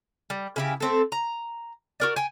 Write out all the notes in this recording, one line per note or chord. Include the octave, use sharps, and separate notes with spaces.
G3
C#3 E4 G4
A3 C4 A4
A#5
F#4 A#4 D5
G5 G#5